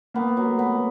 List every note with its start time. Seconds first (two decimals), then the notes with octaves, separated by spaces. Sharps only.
0.14 A#3 B3
0.37 F#3
0.45 A3
0.59 B3
0.73 A3